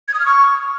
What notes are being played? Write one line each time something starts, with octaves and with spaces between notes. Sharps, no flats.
G#6
D#6
F6
C#6